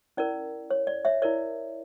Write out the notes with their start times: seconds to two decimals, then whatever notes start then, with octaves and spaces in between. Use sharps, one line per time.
0.17 C#4 E4 A#4 D5
0.70 C#5
0.87 D5
1.05 C#5 E5
1.22 E4 A#4 C#5 D5